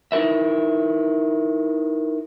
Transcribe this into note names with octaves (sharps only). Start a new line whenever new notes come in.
D#4 E4 A#4 B4 E5